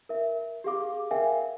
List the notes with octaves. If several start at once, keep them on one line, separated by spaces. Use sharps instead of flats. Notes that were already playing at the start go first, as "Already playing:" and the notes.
A#4 E5
G4 G#4 F5 D6
A#4 E5 F5 G5 G#5